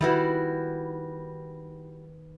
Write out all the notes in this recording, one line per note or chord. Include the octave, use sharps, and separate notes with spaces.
D#3 G3 E4 F#4 B4